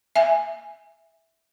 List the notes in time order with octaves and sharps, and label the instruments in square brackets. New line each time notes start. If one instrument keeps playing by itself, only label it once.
[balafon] E5 G#5